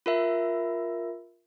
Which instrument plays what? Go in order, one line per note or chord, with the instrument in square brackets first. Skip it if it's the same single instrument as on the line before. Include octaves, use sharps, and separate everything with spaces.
[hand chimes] F4 A#4 E5